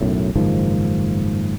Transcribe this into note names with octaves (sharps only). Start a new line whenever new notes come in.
B1 F#2 A2
F#1 G#2 D#3 F3